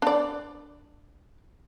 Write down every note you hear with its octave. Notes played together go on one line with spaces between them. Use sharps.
D4 D5